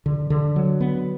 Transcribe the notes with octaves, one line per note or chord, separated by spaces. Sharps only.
D3
D3
F#3
B3